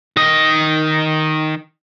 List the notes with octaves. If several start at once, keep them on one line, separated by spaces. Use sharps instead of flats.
D#3 D#5